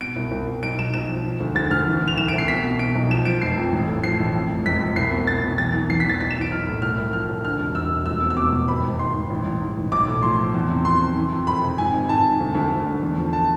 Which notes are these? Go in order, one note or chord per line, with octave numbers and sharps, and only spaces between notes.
B2 D7
C2
C2
C2
B1 D7
B1 E7
B1 E7
F3
F3
D2
D2 A6
D2 F6
E3
C2
F7
E3 E7
C2 D7
C7
B2 B6
B2
B2 D7
B1
F3 E7
F3 D7
F1 C7
F2
A1
A2
F3 C7
A1
F2
F1
F1 B6
F1
C2 C7
B2
B2 A6
C2
E2 A6
E3
E3 C7
B6
E2
A6
B1 B6
E7
E3
D7
B1 F6
A2
C2 F6
C2
F3 F6
C2
D3 F6
E1
E1 E6
E1
F1 E6
B2
E6
B2 D6
F1
G#1 B5
G#1
G#1 C6
G#2
A1
A1
G#2
A1
B1 D6
A2
F3 C6
F3
E2
C3
F3 C6
C3
E3
F2
F2 B5
C3
G#2 G#5
G#1
G#2 A5
G#2
D2
D2
D2
D3
E2
F3
A5